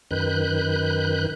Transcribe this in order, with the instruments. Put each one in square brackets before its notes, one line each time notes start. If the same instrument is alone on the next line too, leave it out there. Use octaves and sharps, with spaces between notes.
[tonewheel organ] F#2 D#3 B4 F#6 G6